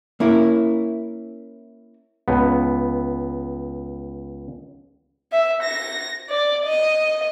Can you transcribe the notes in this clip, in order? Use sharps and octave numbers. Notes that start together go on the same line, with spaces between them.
A#3 C#4 E4 A#4
C#2 B3
E5
A#6
D5
D#5